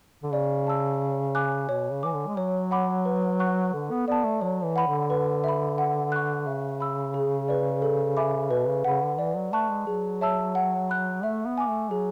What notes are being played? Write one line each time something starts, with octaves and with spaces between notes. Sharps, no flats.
D3
C#3 D5
A5 E6
C#5
G#5 D6 F#6
B2 C#5
C#3
E3 G#5 D6
D3
G#3
F#3 C#5
F#5 B5 D6
B4
F#5 C#6 F#6
D3 A4
B3
B3 D5 A5
A3
F#3 C#5
E3
F#5 B5
D3
B4
E5 B5
F#5
C#6 F#6
C#3 E5
B5 E6
G#4
B4 D5
A4
E5 G#5 B5 D6
B2 B4
C#3
C#3 F#5 B5
D3
E3 D5
F#3
A3 A5 C#6 F#6
G#3
F#3 G#4
C#5 E5 A5 E6
F#5
B5 F#6
A3 E5
B3
G#5 D6
A3
F#3 G#4